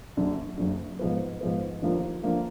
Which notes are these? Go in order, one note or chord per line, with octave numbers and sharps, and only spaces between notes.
F#1 F#2 D3
F#1 F#2 D3
G#2 F3 B3
G#2 F3 B3
D#2 D3 F3 A#3 F4
D3 F3 A#3 F4